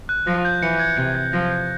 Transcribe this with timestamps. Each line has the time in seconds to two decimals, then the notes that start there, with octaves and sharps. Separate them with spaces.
0.09 F#6
0.27 F3 A#6
0.45 G6
0.62 E3 C#7
0.79 G#6
0.97 C3 C#7
1.15 G#6
1.33 F3 A#6
1.51 G6